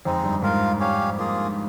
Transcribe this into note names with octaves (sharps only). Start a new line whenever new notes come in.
F2 G#3 C4 D#4
G2
G#2 F4 A#4 F5
C#4 G4 C#5 F5
A#3 F4 G#4